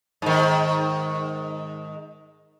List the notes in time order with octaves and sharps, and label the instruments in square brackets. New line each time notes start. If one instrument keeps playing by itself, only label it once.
[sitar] G#2 D#3